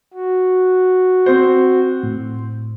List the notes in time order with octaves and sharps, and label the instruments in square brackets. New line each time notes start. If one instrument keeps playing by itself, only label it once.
[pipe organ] F#4
[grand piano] C4 C5
[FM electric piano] A2